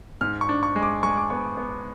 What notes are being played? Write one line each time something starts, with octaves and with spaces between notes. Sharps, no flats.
G#2 F6
C#6
D4
C#6
G#3
D6
G#3 C#6
D6
B3 C#6
B3